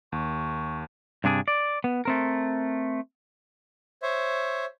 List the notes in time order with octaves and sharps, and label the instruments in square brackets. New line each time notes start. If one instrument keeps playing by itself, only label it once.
[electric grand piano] D#2 [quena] C#6
[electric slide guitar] G2 C3 D4 G#4
D5
B3
A3 C4 A#4
[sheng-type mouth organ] C5 C#5 E5